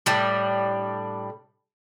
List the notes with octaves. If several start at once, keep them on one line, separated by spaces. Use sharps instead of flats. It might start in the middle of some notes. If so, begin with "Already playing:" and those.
A2 G3 D4